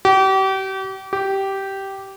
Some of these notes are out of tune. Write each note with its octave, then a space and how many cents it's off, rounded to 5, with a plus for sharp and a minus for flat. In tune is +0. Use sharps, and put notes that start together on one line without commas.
G4 -35
G4 -10